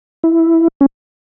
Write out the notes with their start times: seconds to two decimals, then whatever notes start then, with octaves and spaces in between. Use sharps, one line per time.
0.23 E4
0.81 C#4